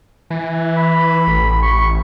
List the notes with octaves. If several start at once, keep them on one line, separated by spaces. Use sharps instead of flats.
E3
B5
A1
C#6